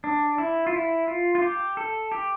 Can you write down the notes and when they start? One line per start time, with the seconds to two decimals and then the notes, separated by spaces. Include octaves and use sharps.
0.04 D4
0.38 E4
0.67 F4
0.72 E4
1.08 F4
1.35 F4
1.42 G4
1.77 A4
2.12 G4